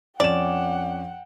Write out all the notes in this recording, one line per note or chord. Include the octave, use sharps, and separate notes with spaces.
F2 C#4 D5 F#5 G5 E7